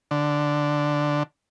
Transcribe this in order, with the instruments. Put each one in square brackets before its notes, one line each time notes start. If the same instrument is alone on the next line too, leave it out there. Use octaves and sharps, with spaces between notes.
[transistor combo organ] D3